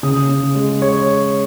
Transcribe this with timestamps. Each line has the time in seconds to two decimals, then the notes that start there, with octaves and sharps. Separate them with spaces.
0.03 C#3 D#6
0.29 C#3
0.55 G#3
0.82 G#3 C#5